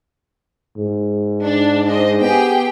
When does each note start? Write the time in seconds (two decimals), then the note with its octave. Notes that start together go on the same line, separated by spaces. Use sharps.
0.77 G#2
1.43 D4
1.84 D4 C5 D#5
2.21 B3 G4 G#4 G5